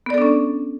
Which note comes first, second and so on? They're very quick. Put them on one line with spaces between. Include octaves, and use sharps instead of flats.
B3 D5 A4 D4 C#4